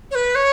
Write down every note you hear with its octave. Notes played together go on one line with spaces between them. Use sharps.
C#5
B4
C#5